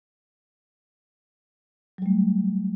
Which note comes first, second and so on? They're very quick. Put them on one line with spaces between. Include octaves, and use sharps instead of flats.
F#3 G3 A3